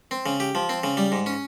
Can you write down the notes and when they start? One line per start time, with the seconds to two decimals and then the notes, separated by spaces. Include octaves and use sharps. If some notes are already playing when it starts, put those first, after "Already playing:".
0.11 C4
0.26 C#3
0.40 G4
0.55 F3
0.69 C4
0.84 C#3
0.97 G3
1.12 G#2
1.26 C#4